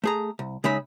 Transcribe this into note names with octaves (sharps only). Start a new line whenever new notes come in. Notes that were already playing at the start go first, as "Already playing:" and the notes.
A3 G#4 A#5
C2
C#3 G#3 D#4 E5 B5